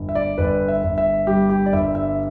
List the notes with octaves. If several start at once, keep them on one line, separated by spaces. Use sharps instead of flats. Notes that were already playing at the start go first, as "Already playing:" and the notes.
Already playing: G1
E5
D5
G1 B4
E5
G1
E5
G3 G4
G4
D5
G1 E5
E5